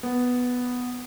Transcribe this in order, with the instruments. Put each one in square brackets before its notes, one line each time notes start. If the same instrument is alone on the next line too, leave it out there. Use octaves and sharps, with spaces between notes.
[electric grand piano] B3